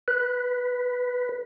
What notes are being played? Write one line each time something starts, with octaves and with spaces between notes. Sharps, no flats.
B4